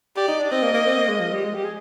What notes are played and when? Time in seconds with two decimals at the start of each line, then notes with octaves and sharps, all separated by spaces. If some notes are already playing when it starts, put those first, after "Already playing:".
0.17 G4 D5
0.28 D#4
0.40 D4
0.52 C4 D#5
0.63 A#3
0.74 A#3
0.86 C4
0.98 A#3
1.09 G#3
1.20 F3
1.33 G3
1.44 G#3
1.55 G4
1.65 G#4